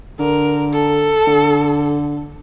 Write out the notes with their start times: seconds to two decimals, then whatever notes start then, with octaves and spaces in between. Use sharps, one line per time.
0.19 D3 A#4
0.73 A4
1.27 D3